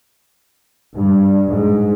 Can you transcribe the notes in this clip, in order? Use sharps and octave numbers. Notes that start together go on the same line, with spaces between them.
G2
G#2